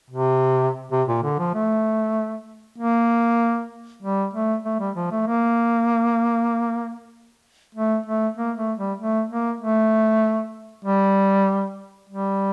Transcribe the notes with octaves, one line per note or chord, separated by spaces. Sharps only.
C3
C3
A#2
D3
F3
A3
A#3
G3
A3
A3
G3
F3
A3
A#3
A3
A3
A#3
A3
G3
A3
A#3
A3
G3
G3